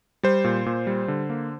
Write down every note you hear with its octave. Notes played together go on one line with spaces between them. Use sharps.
G3 C5
A#2
A#2
G3
D3
A#3